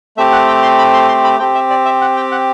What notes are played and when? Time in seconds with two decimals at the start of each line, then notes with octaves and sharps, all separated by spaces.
0.17 A3 C4 G4 E5
0.33 F#5
0.47 G5
0.63 C6
0.78 B5
0.94 C6
1.08 C6
1.24 B5
1.39 C4 G4 G5
1.55 E5
1.70 D5
1.85 E5
2.01 F#5
2.17 G5
2.32 F#5